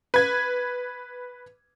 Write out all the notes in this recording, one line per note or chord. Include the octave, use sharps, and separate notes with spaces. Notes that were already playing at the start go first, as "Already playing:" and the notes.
B4 G#6